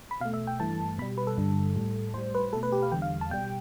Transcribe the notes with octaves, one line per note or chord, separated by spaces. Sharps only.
B5
B2 A3 F5
E5
G5
G2 E3 A3 A5
B2 G3 B5
B4
A4
G2 D3 G3
A2 G3
A2 G3 C5
B4
B2 A3 A4
B4
G4
F5
E2 D3 G3 G5
F5
A5
B2 G3 G5